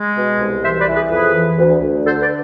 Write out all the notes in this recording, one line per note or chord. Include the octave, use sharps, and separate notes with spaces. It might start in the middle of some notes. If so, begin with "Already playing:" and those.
Already playing: G#3
B2
C2
E3 C5 E5
B4 D5
E3
G#4 B4
F2 G#4 B4
E3
D2
D2
D3 A4 C5
B4 D5